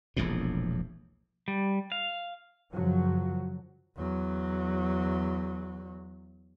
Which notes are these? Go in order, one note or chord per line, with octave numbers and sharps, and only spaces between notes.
E1 A#1 E2 A2
G3
F5
F#2 C#3 F3 F#3
E2 F#3